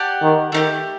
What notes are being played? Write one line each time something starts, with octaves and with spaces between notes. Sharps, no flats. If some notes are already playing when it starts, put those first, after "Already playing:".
Already playing: G4 D5 F#5 A5
D#3
D#3 A3 D#4 G4